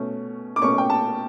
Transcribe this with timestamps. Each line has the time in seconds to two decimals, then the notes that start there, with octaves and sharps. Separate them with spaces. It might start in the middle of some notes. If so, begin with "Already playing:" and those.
Already playing: B2 A3 C#4
0.56 D6
0.62 B2 A3 C#4 C#6
0.78 G5
0.90 A5